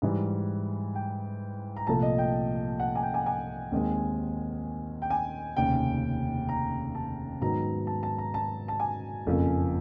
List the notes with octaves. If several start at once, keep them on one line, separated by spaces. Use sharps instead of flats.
G#2 E3 G3
G5
A#5
C2 A#2 F3 A3 A5
D#5
G5
F#5
G#5
G5
G#5
G#5
D#2 D#3 G#3 C4
G5
G#5
F1 D#2 C#3 G5
A#5
A5
G#2 D#3 F#3 B3 A#5
A5
A5
A#5
A5
A5
G#5
F#1 F2 C#3 F3 A#3